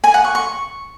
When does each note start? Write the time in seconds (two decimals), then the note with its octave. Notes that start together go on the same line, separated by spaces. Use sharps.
0.04 G#5
0.14 F#5
0.24 C#6
0.35 C#6